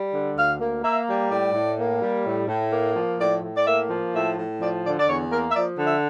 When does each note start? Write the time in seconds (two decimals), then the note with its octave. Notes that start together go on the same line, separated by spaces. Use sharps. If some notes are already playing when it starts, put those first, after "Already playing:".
Already playing: G3
0.13 D3
0.37 D2 F5
0.60 A#3
0.84 A#3 E5
1.07 G3
1.31 A2 D5
1.54 A2
1.78 A#3
2.02 G3
2.26 A2
2.48 A2
2.72 A#3
2.96 F3
3.19 A2 D5
3.43 A2
3.57 D5
3.66 A#3 E5
3.90 F3
4.14 A2 E5
4.37 A2
4.61 F3 D5
4.84 D3 D5
5.00 D5
5.08 E2 C#5
5.31 A#3 A#4
5.50 E5
5.55 F3 D5
5.79 D3
5.86 E5